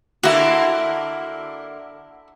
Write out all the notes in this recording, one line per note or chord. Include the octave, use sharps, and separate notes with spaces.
D3 A#3 E4 F#4 E5